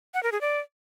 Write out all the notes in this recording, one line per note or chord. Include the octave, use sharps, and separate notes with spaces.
F#5
A#4
G#4
D5